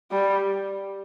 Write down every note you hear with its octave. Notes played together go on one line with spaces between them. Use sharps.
G3